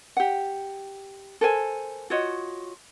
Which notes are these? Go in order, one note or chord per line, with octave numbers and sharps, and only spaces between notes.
G4 F#5
A4 A#4 C5 G#5
F4 F#4 C#5 D#5